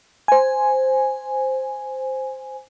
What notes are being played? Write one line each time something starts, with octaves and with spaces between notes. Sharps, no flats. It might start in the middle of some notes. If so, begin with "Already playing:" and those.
C5 G#5